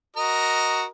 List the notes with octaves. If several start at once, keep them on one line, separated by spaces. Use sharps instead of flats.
F#4 A#4 D#5